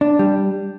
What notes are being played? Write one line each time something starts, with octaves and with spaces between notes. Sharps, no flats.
D4
G3